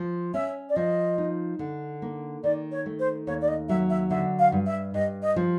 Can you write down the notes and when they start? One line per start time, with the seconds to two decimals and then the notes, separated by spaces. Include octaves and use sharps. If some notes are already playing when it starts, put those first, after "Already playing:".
Already playing: F3
0.34 C#4 E5
0.69 D5
0.76 F3 D#5
1.18 D#4
1.59 D3
2.02 A#3
2.43 D#3 D5
2.72 C#5
2.86 A3
3.00 C5
3.27 D#2 C#5
3.42 D5
3.48 D#5
3.69 F#3 E5
3.90 E5
4.10 D3 E5
4.39 F5
4.52 G2
4.66 E5
4.94 G2 D#5
5.23 D#5
5.36 F3